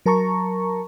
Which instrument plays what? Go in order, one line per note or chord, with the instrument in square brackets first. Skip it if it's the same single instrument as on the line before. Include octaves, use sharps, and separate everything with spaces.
[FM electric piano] F#3 A#4 A5 A#5 C#6